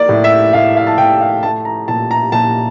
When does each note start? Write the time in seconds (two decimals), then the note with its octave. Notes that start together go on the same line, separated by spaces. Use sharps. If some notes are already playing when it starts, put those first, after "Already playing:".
Already playing: A#3 D5
0.09 A2
0.24 E5
0.53 A2 F5
0.76 F5
0.87 A5
0.98 A2 G5
1.21 F5
1.43 A3 A5
1.65 A#5
1.88 A#2 A5
2.11 A#5
2.32 A#2 A5